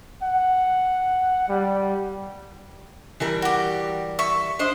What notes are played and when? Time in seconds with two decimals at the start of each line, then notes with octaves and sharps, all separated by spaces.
0.23 F#5
1.49 G3
3.20 E3 G3 A#4
3.42 F#4 G4
4.19 E5 C#6
4.59 D4 C5 D#5